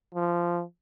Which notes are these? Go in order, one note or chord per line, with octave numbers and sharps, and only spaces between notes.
F3